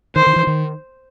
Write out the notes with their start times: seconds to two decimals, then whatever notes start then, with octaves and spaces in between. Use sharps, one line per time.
0.16 D#3 C5
0.27 D#3
0.36 E3
0.47 D#3